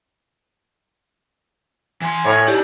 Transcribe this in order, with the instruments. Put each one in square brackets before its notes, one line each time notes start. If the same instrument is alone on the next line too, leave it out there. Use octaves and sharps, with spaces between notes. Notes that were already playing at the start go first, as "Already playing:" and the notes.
[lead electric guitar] E3 C6 [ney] G#5
[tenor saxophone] A2 [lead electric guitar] C#5
[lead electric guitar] D#4 D5 [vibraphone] E4 G4